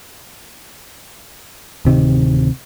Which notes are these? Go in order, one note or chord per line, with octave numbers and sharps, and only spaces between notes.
D1 C3 D#3